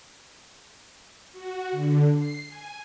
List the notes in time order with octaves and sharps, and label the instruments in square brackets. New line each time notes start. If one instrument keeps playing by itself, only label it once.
[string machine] F#4
D3
C7
G#5